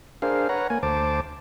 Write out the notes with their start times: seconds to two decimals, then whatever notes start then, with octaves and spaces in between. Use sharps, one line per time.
0.22 D4 G#4 A#4 C5 F5
0.49 B4 C#5 F#5 A#5
0.70 A#3 G#5
0.83 D2 C5 A5 D6